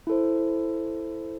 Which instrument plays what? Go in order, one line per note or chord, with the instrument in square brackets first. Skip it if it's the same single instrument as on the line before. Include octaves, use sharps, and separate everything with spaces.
[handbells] E4 A4 C5